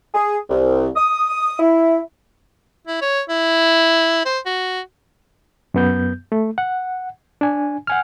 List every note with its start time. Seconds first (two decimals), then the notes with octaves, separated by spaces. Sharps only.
0.14 G#4
0.49 C2
0.96 D#6
1.59 E4
2.87 E4
3.02 C#5
3.29 E4
4.26 C5
4.46 F#4
5.74 F#2 B3 G6
6.32 A3
6.58 F#5
7.41 D4 G#5
7.87 F#5 G#5 F6